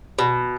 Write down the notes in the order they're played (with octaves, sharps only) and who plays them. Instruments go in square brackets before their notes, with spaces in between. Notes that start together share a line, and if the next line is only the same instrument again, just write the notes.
[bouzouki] B2